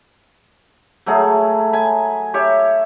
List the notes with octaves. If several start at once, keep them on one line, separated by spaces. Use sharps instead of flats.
F#3 A3 G#4
G#5 B5
G4 C#5 E5